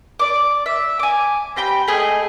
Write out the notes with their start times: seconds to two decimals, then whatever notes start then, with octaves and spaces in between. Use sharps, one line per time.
0.19 D5 D6
0.66 E5
0.99 G#5 D6
1.56 C4 G4 G5 B5
1.88 A3 G#4 D#5